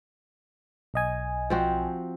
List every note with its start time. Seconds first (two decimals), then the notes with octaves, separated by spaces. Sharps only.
0.94 B1 D#5 G#5
1.50 F3 C4 F#4